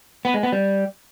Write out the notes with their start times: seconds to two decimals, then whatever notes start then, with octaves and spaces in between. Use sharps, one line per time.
0.25 B3
0.34 G#3
0.43 B3
0.52 G3